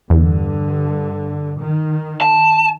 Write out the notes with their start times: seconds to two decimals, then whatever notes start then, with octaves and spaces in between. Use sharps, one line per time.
0.10 E2 G2 D3
1.60 D#3
2.21 A5